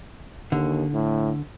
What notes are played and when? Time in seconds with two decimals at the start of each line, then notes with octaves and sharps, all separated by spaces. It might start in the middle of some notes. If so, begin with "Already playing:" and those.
0.52 D#2 D3
0.94 A2